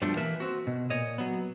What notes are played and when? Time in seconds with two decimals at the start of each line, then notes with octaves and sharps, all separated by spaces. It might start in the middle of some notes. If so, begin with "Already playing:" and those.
0.02 G2 B2 F3 G3 A3 D4
0.17 E3 A#3 A#4 B4 E5
0.40 C4 F#4
0.67 B2
0.90 A#2 C#5 D#5
1.18 F#3 B3